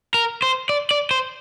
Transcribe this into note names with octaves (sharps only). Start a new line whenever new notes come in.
A#4
C5
D5
D5
C5